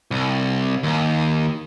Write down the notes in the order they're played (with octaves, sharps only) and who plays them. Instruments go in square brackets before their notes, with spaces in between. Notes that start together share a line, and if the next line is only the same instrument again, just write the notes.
[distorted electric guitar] C2
D#2